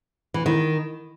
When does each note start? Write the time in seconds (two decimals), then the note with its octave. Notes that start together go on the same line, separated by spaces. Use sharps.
0.34 E3
0.46 D#3